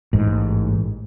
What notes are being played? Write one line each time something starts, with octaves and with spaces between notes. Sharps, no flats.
A1 G#2